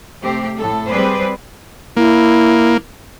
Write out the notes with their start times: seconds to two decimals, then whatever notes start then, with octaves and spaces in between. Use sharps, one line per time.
0.22 C3 A3 C4 G4
0.58 A2 A4
0.88 G3 C4 G#4 B4 C5 D5
1.97 A#3 E4